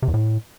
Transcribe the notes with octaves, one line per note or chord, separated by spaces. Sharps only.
C3
E2
A2